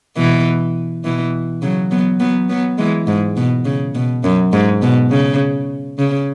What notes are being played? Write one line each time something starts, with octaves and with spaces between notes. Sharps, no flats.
B2 E3
B2 E3
C#3 F#3
F#3 B3
F#3 B3
F#3 B3
E3 G#3
G#2
B2
C#3
B2
F#2
G#2
B2
C#3
C#3